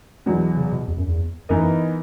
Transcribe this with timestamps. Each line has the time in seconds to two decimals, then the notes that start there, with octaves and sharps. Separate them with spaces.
0.26 E2 B2 F#3
0.57 C#3
0.72 B2
0.88 E2
0.98 F#2
1.08 E2
1.49 F#2 E3 B3 D#4 A#4 D#5